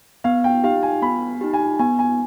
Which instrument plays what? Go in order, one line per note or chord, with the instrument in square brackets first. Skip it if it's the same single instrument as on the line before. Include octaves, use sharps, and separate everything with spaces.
[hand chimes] B3 [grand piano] F5
[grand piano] G5
[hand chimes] D#4 G4 [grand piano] F5
[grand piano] G#5
[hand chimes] B3 [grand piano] B5
[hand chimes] D#4 G4
[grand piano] G#5
[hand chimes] B3 [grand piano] G#5
[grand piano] G#5